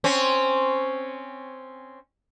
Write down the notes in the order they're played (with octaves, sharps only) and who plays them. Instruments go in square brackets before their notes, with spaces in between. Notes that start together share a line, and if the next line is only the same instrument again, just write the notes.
[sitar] C4 C#4